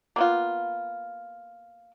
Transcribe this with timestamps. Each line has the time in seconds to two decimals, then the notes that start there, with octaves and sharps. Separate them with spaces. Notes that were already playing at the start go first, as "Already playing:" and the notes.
0.16 A#3 B3 F4